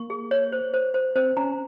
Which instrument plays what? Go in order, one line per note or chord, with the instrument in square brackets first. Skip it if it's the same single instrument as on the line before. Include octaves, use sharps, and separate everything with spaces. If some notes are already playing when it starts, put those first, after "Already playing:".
Already playing: [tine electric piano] A#3 [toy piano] C#6
[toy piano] G#4
C#5
C5
C5
C5
[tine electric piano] C4 [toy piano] C5
[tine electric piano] C#4 [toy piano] A#5